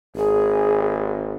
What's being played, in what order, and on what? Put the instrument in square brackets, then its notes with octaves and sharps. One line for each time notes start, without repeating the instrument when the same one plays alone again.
[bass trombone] G#1 [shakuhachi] G#4